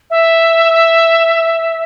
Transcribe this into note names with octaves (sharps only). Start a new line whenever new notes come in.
E5